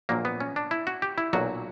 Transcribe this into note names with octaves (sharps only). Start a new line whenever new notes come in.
A#1 A#2 F#3 A#3
B3
C#4
D4
E4
F#4
G4
E4
B1 A#2 F#3 F#4